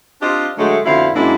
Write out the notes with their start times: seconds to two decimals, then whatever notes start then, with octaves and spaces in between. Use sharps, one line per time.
0.21 C4 D4 F4 G4 D#5
0.58 D3 F#3 G#3 A3
0.85 F2 B2 D3 E4 C5 F5
1.14 F#2 A#2 G#3 A#3 D4 E4